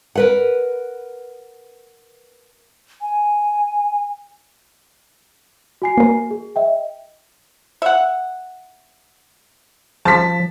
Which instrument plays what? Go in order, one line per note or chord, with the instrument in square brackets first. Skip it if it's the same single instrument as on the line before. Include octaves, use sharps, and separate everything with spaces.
[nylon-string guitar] A#4 B4 F#5
[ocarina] G#5
[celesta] F#4 G#5 C7
[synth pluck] A#3 A#4
[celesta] G#4
D#5 E5 G5
[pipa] E5 F#5
[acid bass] F3 [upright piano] A5 B6